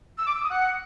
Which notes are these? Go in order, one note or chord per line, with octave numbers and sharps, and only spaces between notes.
E6
D6
E6
D#6
F#5